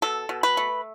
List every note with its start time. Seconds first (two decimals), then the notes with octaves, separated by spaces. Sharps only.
0.02 B2 A4
0.29 B2
0.43 B4
0.57 A3